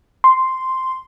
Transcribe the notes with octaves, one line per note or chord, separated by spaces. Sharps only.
C6